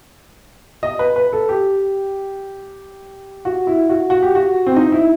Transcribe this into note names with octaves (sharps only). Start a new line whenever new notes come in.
D#5
B4
B4
A4
G4
F#4
E4
F#4
F#4
G4
F#4
C4
D#4
E4